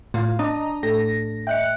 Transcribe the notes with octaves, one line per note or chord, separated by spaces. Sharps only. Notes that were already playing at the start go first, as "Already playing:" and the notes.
A2 F4 F5
D4 D#5 A#5 D#6
A2 A3 A4 A#6
D#5 E5 G5 F#6 C#7